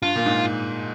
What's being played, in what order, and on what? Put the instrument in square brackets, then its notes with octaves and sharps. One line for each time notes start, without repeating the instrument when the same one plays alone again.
[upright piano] G2 [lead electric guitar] F4
[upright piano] A#2
G#2